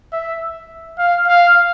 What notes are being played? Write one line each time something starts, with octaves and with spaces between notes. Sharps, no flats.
E5
F5
F5